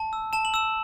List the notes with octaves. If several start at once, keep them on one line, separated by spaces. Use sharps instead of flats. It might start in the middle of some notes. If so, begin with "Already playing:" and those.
Already playing: A5
E6
A5 E7
F#7
E6 E7